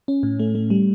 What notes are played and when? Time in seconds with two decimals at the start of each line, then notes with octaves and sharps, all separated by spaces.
0.08 C#4
0.23 A2
0.39 A3
0.55 A3
0.70 G3